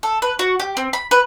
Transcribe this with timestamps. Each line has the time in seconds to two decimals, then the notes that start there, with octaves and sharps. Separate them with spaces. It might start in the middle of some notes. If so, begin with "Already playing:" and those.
0.03 A4
0.22 B4
0.39 F#4
0.60 G4
0.77 C4
0.93 B5
1.11 B4